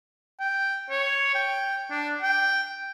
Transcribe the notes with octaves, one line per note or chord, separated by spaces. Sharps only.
G5
C#5
G5
D4
G5